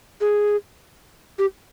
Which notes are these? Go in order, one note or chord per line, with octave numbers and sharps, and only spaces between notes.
G#4
G4